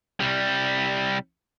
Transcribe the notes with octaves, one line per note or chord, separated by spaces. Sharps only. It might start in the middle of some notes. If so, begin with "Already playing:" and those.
C2 G3